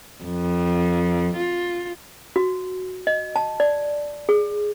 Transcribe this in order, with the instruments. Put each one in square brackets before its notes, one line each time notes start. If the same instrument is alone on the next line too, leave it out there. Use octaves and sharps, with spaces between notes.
[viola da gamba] F2
F4
[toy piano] F#4
D#5
A5
D5
G#4